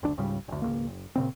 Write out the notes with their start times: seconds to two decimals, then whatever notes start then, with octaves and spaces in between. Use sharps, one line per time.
0.03 F#1 D2 D4
0.18 C#2 G#2 C#3 G3
0.48 F#1 D2
0.62 G#1 C#2 A#3
0.87 F#1
1.16 A#2 C#3 C4